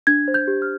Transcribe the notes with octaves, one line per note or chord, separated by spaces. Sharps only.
D4 G#6
C5
G6
G4
F6